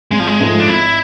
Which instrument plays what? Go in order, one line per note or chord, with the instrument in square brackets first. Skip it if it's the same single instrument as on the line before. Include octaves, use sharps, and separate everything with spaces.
[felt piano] G#1 [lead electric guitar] G#3
[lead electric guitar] F3
G#3
[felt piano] G#2 F3 A3
[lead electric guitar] D4
[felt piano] G#1 [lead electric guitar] E4